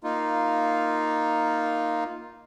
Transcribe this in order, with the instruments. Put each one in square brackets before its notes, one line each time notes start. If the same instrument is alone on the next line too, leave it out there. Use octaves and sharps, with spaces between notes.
[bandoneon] A#3 D#4 F4